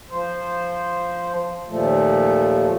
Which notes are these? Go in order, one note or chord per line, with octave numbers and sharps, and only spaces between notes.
F3 C5
D#2 A#2 F3 A3